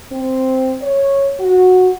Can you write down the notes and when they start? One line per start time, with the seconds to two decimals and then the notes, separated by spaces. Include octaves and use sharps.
0.11 C4
0.81 C#5
1.38 F#4